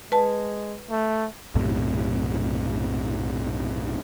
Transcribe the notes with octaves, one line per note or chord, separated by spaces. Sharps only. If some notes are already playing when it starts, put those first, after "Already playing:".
G#3 B4 A5
A3
B1 F#2 A2 C3